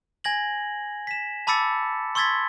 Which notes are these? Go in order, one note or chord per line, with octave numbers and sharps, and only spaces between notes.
G#5 G#6 A#6 F#7
B6 E7
A5 B5 D6 E6 A6 C#7
C6 C#6 E6 G#6 A6 B6